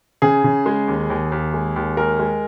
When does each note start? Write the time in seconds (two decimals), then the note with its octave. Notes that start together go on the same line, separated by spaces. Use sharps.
0.22 C#3 G#4
0.44 C#3
0.66 G#3
0.88 D#2
1.10 D#2
1.32 D#2
1.54 G#3
1.76 D#2
1.97 G#3 A#4
2.19 G#3